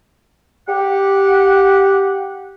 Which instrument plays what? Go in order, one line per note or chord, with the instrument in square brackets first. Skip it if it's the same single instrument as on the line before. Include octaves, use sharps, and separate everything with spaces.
[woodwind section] G4 F#5